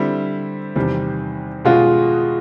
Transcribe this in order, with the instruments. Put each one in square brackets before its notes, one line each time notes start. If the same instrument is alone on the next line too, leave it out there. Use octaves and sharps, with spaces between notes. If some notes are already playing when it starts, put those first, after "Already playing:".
Already playing: [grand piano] D3 G3 C4 E4
E2 C3 D#3 G3 C4
[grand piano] B2 G#3 C#4 F#4 [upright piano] F4